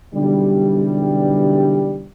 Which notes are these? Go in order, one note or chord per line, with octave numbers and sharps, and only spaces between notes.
B1 D3 E3 G3